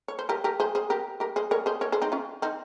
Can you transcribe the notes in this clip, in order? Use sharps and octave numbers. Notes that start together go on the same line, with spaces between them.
C#5
C5
G4 A#4
G4 A#4
G#4 C5
G#4 C5
G4 A#4
G4 A#4
G#4 C5
A#4 C#5
G#4 C5
A#4 C#5
G#4 C5
C4 D#4
C#4 F4
C4 D#4